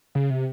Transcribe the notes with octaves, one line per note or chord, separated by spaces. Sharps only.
C#3
C3